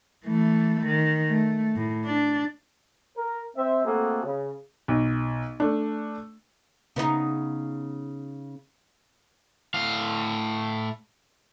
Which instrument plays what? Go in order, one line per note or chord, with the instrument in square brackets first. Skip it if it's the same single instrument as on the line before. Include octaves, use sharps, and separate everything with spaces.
[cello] E3 A3
D#3
A3
A2
D4
[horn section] A#4
C4 C5 E5
A3 A#3 C4 F#4 G#4 A4
C#3
[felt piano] B1
A3 D4
[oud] C#3 B3 D#4
[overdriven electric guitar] A2 F5